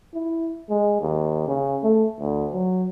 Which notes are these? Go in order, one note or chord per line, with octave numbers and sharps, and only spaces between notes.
E4
G#3
D#2
C#3
A3
D2
F#3